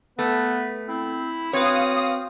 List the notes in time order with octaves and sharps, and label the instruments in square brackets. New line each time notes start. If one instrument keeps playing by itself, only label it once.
[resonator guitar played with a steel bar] A3 [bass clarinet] B3 [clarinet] B4
[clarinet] C4 [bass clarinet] E4
[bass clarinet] C4 [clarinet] F#4 [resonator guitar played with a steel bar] B4 C#5 [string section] F5 D#6